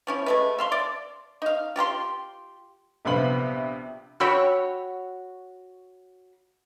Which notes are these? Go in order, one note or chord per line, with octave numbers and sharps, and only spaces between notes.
F3 C#4 E4
G#3 A3 B4
E5 F5 C6
D5
D#4 F5
F4 G4 A#5 C6
A#1 C3 B3 F5 B5 F#7
F#4 C#5 G5 B5 E6